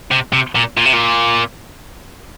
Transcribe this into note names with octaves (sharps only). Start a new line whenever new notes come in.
C3
C3
A#2
A#2
C3
A#2